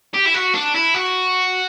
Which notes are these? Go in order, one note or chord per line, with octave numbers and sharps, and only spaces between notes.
G4
E4
F#4
D4
E4
F#4